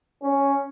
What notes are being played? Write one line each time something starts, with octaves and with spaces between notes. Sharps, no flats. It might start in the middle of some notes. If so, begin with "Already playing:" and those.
C#4